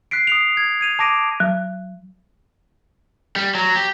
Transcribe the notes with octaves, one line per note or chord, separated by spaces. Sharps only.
F#6 B6 C7 D7
D#6 C7 F7
G#6
G#6 D#7 F7
A5 D6 A#6 D7 D#7
F#3
G3
F#3
G4